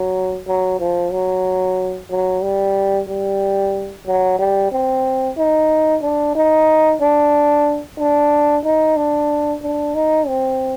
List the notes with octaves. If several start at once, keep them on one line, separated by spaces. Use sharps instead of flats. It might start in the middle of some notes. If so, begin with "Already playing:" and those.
Already playing: F#3
F#3
F3
F#3
F#3
G3
G3
F#3
G3
C4
D#4
D4
D#4
D4
D4
D#4
D4
D4
D#4
C4